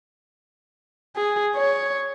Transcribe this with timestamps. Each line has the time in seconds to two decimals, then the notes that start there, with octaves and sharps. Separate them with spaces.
1.17 G#4
1.56 C#5